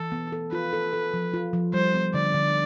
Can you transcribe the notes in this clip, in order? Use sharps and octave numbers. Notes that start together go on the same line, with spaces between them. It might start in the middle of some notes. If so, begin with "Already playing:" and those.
Already playing: E3 A4
B3
A4
F4 B4
A4
A4
F3
F4
F3
G3 C5
B3
D3 D5
D3